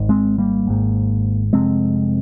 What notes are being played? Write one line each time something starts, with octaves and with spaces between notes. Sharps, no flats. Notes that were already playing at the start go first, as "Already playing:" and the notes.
Already playing: G#1 G#2
G#3 C4
G3 A#3
G#1 G#2
F1 F2 C3 G#3 C4